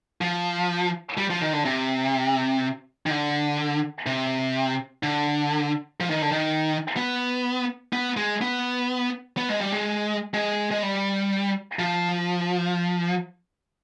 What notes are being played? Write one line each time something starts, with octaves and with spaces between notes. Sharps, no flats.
F3
G3
F3
D#3
D3
C3
D#3
D3
C3
D3
F3
D#3
D3
D#3
B3
B3
G#3
B3
B3
G#3
G3
G#3
G#3
G#3
G3
F3